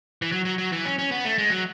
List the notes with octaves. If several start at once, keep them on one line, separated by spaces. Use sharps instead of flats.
E3
F#3
F#3
F#3
E3
C#4
C#4
B3
A3
G#3
F#3